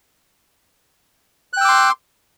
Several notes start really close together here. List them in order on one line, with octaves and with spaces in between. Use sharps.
F#6 G5 E6 D6 C6